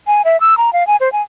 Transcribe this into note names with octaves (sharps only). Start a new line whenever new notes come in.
G#5
E5
E6
A#5
F5
G#5
C5
G#5